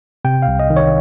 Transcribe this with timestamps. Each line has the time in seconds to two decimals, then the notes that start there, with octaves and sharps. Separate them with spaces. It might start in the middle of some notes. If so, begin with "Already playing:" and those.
0.25 C3 G5
0.42 F5
0.48 C2
0.60 D#5
0.70 D#3
0.77 C#5